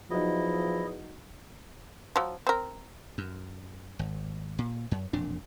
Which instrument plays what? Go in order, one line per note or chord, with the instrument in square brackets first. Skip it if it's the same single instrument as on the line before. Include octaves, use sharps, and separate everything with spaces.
[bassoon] E2 [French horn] F3 [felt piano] F#3 D#4 [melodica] E4 D#5
[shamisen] F3 F#3
C4 A#4
[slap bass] F#2
G#1
A#2
F#2
E1 F2 A#2 D4